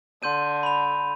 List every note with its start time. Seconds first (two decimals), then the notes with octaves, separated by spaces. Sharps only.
0.23 D3 C6 G6 D#7
0.63 B5 F7